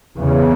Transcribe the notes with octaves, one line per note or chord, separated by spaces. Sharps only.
E2 C#3